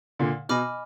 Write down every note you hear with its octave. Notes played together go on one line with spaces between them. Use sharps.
A#2 D3
B2 D#5 G#5 B5 D6 F6